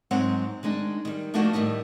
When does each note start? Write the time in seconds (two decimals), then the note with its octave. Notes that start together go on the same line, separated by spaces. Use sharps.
0.11 G#2 F#3 G#3 C4 F#5
0.63 D#3 G#3 D4 D#4
1.05 D#3 G3
1.34 F3 A3 A#3 D4 D#4 F#4
1.53 A2 D#3 G3 D#5